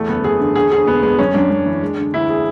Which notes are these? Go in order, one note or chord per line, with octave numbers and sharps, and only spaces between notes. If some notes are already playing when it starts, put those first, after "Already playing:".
Already playing: E2 A3
F#1 B3
E2 G#4
D3
E1 G#4
D2 G#4
E1 B3
G#3 B3
F#2 C#4
F#2 D4
F#2
E3
G#3
D3
D2 E4
G#4